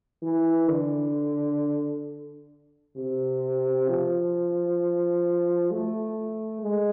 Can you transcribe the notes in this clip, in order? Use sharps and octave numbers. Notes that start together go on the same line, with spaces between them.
E3
D3
C3
F3
A3
G#3